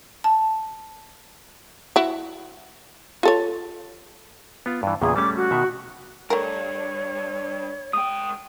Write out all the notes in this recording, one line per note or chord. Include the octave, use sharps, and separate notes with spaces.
A5
E4 F#4
F4 A4 C#5
B3 F4
G2 E3
E2 A#2 C#3 G#4
G3 A3 C#4 D6
F#4
B2 D#3 E5
G2 A3 A#4 C#5
G#2 G5 D#6